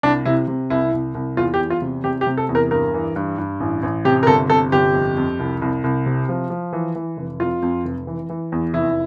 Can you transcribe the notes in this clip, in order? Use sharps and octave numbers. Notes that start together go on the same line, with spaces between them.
C2 D4
C3 E4
C3
C2 E4
C2
C2
E2 F4
G4
E2
F4
C3
C3 G4
G4
C3
A4
E2
A#4
G2 A#4
E3
G2
G2
A1
A1
C3 G4
A#4
G1 A4
C3 A4
G1 G4
F2
F2
C2
C2
C2
C3
F3
F3
E3
E3
F1
F2 F4
F2
F1
E3
E3
E2
F1 E4